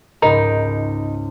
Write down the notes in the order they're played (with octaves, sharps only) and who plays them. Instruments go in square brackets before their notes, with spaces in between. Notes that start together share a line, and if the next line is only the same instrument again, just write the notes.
[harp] C#2 G#2 G5 [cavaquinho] D#4 [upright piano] A#4 B5 [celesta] A#5